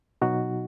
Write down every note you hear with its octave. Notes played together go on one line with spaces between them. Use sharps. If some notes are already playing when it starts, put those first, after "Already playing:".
B2 F#3 D#4 F#4